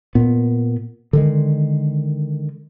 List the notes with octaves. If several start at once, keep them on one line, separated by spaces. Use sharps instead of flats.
A#2 B3
D3 D#3 G#3